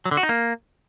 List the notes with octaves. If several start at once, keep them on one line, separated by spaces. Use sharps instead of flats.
F#3
D3
F#4
D#4
A#3